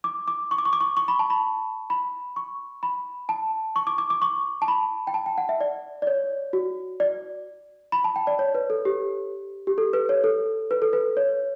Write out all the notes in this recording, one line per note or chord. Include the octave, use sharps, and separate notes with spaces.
D6
D6
C#6
D6
C#6
D6
C#6
C#6
B5
A5
B5
B5
C#6
B5
A5
C#6
D6
D6
D6
C#6
A5
B5
G5
A5
G5
F#5
E5
D5
D5
C#5
F#4
D5
B5
A5
G5
D5
C#5
B4
A4
G4
G4
A4
B4
C#5
A4
B4
A4
B4
C#5